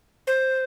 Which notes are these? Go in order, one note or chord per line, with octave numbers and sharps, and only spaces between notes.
C5